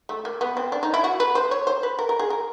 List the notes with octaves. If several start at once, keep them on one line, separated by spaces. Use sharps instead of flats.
A3
A#3
B3
C4
D4
D#4
E4
F#4
B4
C5
C#5
C5
B4
A#4
A#4
G#4
A#4